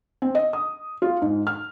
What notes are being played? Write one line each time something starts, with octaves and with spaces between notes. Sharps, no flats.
C4
D#5
D#6
F4
G#2
F6